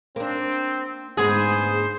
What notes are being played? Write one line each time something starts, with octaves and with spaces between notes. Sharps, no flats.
A#3 C4 D4
D2 G#2 B3 G#4 C5